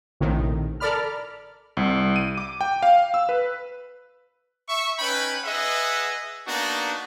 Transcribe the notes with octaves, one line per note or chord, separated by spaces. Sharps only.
A#1 A2 C3 D#3
A4 A#4 D5 B5 F6
C2
D#7
D6
G5
F5
E6
B4
E5 C#6
C#4 D#4 B4 G5 B5
G#4 B4 D#5 E5 F#5
A#3 B3 D4 D#4 F#4